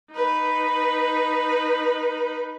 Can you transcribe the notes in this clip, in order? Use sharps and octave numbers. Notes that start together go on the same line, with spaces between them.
D#4 B4